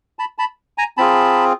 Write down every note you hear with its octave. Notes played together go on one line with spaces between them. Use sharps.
A5 B5
A5 B5
G#5 A#5
C4 F4 G#4 A5 B5